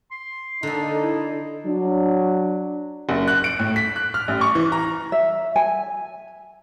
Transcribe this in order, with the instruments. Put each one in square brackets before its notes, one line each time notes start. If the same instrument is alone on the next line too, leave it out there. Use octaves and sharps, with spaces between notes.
[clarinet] C6
[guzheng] D3 A4 [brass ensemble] A#3 D4 D#4
[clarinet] E4
[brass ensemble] F#3 D4
[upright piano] F#1
F#6
D7
A2
B6
F#6
F6
A1
C#6
E3
A#5
[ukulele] E5
G#5